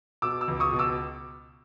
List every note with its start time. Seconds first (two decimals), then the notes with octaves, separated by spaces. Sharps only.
0.22 B2 D6 E6
0.41 D6 E6
0.48 C#2
0.60 C#6 D#6
0.72 B2
0.79 D6 E6